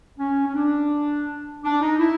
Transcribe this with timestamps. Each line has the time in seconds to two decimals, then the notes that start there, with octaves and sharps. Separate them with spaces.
0.19 C#4
0.47 C#4
0.55 D4
1.64 D4
1.81 D#4
1.99 E4